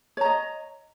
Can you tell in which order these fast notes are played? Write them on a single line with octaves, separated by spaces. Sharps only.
C#5 A#5 D#5